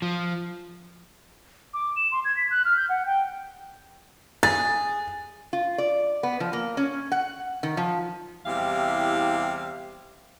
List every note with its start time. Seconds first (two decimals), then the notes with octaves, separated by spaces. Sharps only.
0.02 F3
1.74 D6
1.96 E7
2.12 C6
2.25 G#6
2.37 B6
2.51 F#6
2.65 F6
2.77 G6
2.89 F#5
3.06 G5
4.43 G#4 A6
5.53 F4
5.78 D5
6.23 B3
6.40 F3
6.53 A#3
6.77 C#4
7.12 F#5
7.63 D#3
7.77 F3
8.46 E2 C3 G3 E4 F5